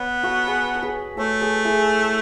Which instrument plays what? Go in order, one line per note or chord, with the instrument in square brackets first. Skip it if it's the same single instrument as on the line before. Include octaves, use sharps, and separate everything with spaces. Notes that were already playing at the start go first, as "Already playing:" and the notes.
Already playing: [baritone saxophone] B3 [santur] C#5
[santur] F#4 A4
G#4 B4
A4
G#4 B4
[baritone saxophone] A3 [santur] A4 C#5
[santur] G#4 B4
E4 G#4